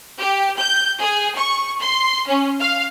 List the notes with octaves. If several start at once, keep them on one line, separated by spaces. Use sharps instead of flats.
G4
G6
G#4
C#6
C6
C#4
F5